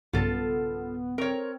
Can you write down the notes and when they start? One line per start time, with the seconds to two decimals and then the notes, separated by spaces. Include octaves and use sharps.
0.13 B1 G2 C#3 B3 F4 A4
1.18 C4 A#4 C#5